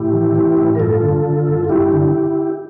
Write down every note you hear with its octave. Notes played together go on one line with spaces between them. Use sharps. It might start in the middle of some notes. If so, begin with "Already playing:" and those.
Already playing: A2 E4 G4
E3
E3
A2
A#4
G2 F4 A4
D3
D3
G2
F4
G2 E4 G4
D3